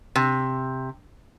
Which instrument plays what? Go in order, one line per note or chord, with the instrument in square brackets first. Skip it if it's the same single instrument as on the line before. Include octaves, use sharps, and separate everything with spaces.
[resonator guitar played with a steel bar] C3